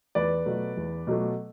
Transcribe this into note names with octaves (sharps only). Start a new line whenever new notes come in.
E2 B4 D5
B2 F#3 A3
E2
B2 F#3 A3